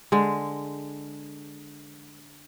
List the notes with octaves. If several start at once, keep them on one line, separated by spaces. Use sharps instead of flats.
D3 G#3